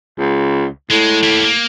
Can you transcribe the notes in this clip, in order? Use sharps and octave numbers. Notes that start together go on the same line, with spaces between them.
C#2
A2 G#3
A#3 G4
A#3